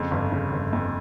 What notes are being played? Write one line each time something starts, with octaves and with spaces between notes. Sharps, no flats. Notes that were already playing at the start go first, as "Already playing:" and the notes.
Already playing: F2 C#3
G1
C#3
G1
F2